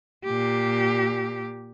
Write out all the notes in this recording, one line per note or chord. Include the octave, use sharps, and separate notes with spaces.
A#2 G4